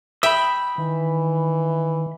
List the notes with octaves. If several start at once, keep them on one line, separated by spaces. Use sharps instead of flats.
E5 G5 B5 D#6
D#3 E3